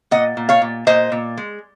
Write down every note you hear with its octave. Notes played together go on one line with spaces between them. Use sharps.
A#2 D#5 F#5
A#2
C#5 F5
A#2
A#2 C5 D#5
A#2
G#3